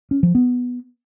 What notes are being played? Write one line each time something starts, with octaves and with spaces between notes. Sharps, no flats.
C#4
F3
B3